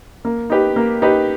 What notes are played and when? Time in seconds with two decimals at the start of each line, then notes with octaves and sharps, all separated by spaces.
0.25 A#3
0.50 D#4 G4 B4
0.76 A#3
1.02 D#4 G4 B4